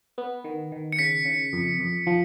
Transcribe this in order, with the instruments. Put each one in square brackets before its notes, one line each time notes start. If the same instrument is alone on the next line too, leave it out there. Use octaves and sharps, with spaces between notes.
[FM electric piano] B3
D#3
D#3
[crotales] C#7
[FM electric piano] C#3 [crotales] B6
[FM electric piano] C#3
F2
F2
F3